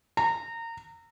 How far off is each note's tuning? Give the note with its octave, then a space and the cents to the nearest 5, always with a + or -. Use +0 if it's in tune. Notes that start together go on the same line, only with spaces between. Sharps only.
A#5 -25